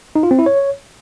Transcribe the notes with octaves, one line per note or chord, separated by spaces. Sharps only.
D#4
F4
C4
E4
C#5